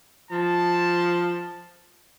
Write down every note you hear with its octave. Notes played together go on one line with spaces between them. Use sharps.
F3 A5